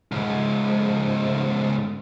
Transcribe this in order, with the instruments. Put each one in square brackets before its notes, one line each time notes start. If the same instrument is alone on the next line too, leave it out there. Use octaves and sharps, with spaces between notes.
[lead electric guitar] C#2 G#2